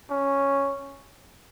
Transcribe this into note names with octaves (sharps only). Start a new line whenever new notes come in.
C#4